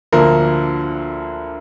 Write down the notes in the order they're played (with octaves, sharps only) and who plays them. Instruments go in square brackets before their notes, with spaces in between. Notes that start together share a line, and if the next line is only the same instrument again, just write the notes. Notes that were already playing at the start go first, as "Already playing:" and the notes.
[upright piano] D2 D3 F3 A#3 A#4